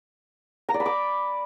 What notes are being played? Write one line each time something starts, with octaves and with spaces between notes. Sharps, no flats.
A#5
D5
B5
D6